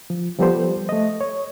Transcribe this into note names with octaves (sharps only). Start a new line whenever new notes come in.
F3
F3 G3 B3 G4 A4 C5
A3 D#5
C#5